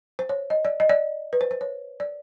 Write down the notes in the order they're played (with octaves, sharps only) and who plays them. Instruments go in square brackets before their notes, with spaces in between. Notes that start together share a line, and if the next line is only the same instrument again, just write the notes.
[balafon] C5
C#5
D#5
D5
D#5
D5
B4
C5
C5
C#5
D5